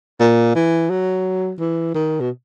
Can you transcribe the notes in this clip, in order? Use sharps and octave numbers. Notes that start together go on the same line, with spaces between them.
A#2
E3
F#3
E3
D#3
B2